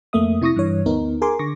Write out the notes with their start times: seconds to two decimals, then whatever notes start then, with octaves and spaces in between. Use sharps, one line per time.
0.13 F2 A3 A#3 E5 D#6
0.41 C3 E4 C#6 D#6 A#6
0.56 G2 E3 C#5
0.86 D2 B3 D#4 A#4
1.22 G#4 A#4 G#5 C6 D6
1.39 D3 C#6 D6 A#6